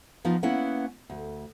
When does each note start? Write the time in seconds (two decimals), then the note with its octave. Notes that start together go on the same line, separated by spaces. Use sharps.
0.25 F3 B3 D#4 F4
0.43 A#3 B3 C#4 E4 F#5
1.10 D2